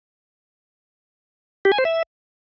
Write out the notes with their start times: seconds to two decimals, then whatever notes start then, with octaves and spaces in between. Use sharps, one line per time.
1.65 G4
1.72 G#5
1.78 C5
1.85 E5